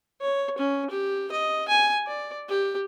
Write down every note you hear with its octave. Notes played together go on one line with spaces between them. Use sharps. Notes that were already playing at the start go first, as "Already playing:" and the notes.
C#5
C#4
G4
D#5
G#5
D5
G4